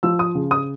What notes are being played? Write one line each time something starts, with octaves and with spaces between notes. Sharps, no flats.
F3 E6
D#6
C#3
D#6